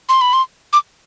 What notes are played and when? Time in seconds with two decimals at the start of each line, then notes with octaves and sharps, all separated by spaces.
0.09 C6
0.21 B5
0.33 C6
0.73 D6